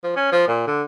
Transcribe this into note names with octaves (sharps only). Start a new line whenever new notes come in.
F3
C#4
F3
A#2
D3